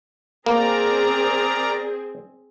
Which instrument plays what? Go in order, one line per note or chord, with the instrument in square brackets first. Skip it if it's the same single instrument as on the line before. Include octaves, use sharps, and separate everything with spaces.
[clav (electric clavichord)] A#3 [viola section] C4 G#4 [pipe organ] A#4 D5 A#5